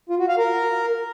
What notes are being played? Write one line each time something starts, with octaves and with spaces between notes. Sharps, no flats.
F4
F#4
F5
A#4